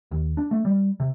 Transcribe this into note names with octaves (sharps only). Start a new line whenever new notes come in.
D#2
D4
A3
G3
C3